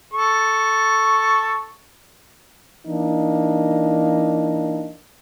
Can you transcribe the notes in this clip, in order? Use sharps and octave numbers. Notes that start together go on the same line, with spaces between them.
A4 C#6
E3 A#3 D4 D#4